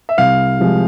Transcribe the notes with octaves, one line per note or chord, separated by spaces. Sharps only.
E5
C2 F5
C3 F3 G#3